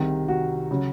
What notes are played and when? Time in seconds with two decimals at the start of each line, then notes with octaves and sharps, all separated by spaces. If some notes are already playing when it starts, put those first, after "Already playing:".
Already playing: C2 C3 D#3 G#4
0.28 F#4
0.71 C#3 F#3